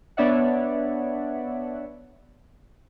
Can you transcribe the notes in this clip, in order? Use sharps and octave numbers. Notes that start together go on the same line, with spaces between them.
B3 D4 C#5 D5 E5 F#5